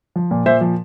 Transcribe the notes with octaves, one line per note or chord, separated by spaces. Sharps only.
F3
A#2
A#2 C5 E5
F3